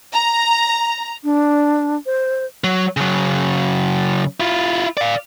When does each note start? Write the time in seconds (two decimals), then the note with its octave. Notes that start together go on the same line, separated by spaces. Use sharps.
0.13 A#5
1.23 D4
2.06 C5
2.64 F#3
2.97 C#3 F#3
4.40 E4 F4
4.97 D5 F5